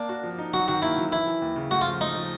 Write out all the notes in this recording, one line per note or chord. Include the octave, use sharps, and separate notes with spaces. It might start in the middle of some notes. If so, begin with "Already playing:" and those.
Already playing: A#3 D4
F#4
F3
D#4
F#3 F#4
D#3 F#4
A#3 E4
F#3
E3 E4
E3
D#2
C#3
A3 F#4
F4
F3
A3 D#4
F3